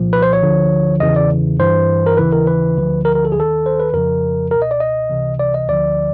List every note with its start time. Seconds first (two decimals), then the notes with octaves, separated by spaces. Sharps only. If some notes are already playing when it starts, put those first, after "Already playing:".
Already playing: C2 A#2 F3
0.13 B4
0.22 C5
0.33 C#5
0.43 D2 D3 F3
1.00 E2 C#3 E3 D#5
1.16 D5
1.59 G2 E3 C5
2.06 A#4
2.17 D#2 C#3 E3 B4
2.32 A#4
2.47 B4
2.76 D2 D3 F3
3.05 A#4
3.15 A#4
3.25 A4
3.32 G#4
3.35 D#2 D#3 A4
3.66 C5
3.80 B4
3.93 F2 C#3 F3 A#4
4.51 C#2 B2 A#4
4.62 D#5
4.71 D5
4.80 D#5
5.09 C#2 C3 E3
5.40 D5
5.54 D#5
5.68 D2 D3 F3 D5